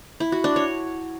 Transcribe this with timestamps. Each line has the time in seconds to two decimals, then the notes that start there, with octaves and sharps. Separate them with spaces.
0.20 E4
0.32 F#4
0.44 D4
0.56 C#5